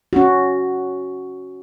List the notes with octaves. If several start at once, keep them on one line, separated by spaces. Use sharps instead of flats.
C#4 F#4